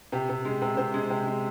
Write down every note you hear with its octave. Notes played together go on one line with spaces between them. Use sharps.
C3 G4
C3
G#3
C3
C3 C5
G#3
C3
G#3